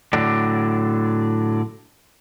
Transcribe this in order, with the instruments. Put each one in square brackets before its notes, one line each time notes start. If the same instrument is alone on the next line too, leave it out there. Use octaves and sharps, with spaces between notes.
[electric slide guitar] A2 D3 F#3 D5